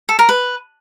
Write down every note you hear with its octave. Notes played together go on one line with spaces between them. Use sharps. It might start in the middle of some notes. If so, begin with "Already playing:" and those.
A4
A#4
B4